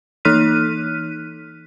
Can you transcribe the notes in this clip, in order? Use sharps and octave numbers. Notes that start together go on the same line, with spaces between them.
E3 D#4 F6 F#6 B6 D#7